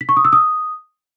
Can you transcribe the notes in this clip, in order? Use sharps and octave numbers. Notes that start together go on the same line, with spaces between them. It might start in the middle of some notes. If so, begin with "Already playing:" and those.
B6
C#6
D#6
E6
D#6